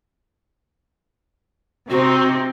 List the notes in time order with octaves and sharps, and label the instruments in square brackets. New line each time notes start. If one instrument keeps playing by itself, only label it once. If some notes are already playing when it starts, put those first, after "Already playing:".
[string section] C3 C4 D#4 [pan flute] F#4